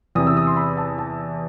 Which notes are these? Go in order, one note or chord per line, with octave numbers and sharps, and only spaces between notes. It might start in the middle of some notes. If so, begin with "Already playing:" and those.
E2 C3 E3 D#6
E6
D#6
C6
B5
A5
A5